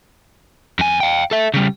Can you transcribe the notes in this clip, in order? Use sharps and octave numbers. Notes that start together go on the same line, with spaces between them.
F2 G#5
F5 G5
A4 E5
C#3 G3